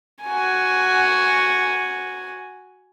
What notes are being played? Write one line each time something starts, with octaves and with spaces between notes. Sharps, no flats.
F#4 G#5